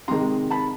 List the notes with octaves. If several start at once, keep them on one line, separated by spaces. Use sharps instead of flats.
C3 D#3 G#3 A#5 C6
A5 B5